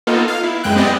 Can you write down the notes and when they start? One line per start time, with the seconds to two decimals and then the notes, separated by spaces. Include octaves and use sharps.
0.07 A#3 B3 D#4 F4 A4
0.28 F5
0.43 E4
0.64 F#2 G#3 G5 F#6
0.75 G#3 B3 C4 G4 D5 D#5